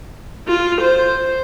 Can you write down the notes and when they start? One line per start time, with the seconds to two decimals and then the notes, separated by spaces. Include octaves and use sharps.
0.48 F4
0.81 C5